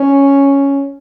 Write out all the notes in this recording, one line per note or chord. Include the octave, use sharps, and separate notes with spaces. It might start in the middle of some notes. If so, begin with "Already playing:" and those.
Already playing: C#4